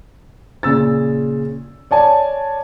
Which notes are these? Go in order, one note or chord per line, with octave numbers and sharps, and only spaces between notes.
A#2 C#3 E6 A6
C#5 D5 G#5 A5